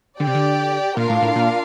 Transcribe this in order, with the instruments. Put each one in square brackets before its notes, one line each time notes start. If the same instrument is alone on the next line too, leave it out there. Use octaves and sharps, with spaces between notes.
[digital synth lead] D3 [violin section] G4 D5 G5
[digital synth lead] C3
D3
[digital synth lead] A#2 [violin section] D4 F4 A#4 F5
[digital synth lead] A2
A2
A#2